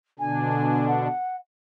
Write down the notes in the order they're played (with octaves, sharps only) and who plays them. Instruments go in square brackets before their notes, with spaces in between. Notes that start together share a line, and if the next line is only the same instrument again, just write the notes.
[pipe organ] B2 D3 D4 [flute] G#5
[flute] F#5